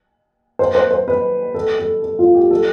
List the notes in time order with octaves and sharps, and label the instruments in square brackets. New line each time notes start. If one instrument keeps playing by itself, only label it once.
[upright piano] C5
C5
C5
B4
A4
A4
A4
F4
G4
A4